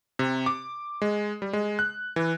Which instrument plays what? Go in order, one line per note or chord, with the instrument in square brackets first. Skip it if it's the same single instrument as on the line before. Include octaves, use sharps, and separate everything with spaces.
[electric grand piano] C3
D6
G#3
G3
G#3
F#6
E3